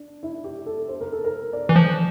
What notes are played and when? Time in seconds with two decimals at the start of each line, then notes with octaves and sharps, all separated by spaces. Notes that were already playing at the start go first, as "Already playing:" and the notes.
Already playing: D4
0.23 E4
0.44 G4
0.66 A4
0.88 C5
1.01 A#4
1.12 A4
1.24 A#4
1.53 D5
1.69 E3
1.76 F3